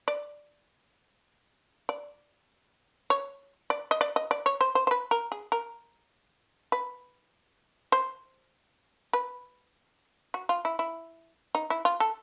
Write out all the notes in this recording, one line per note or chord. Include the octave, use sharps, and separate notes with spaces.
D5
D5
C#5
D5
D#5
D5
D#5
D5
C#5
C5
C5
C5
B4
A#4
G#4
A#4
B4
C5
B4
F#4
F4
E4
E4
D#4
E4
F4
A4